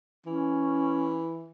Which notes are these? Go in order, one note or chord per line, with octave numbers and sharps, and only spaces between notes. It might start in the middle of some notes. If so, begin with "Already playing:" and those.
E3 C#4